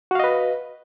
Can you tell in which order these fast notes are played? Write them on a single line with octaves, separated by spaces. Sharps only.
F#4 F5 D#5 B4